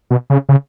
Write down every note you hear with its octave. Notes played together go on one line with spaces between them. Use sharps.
B2
C#3
C#3